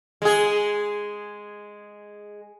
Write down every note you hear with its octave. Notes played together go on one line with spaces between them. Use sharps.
G#3 G#4